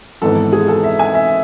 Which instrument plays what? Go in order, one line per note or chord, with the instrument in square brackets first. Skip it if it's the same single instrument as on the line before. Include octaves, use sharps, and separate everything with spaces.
[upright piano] G#1 G#2 E3 B3 A4
G#4
A4
E5
G#5
E5